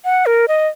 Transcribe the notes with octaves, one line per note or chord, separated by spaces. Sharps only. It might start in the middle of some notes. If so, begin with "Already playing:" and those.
F#5
A#4
D#5